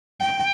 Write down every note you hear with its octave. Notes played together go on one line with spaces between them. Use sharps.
G5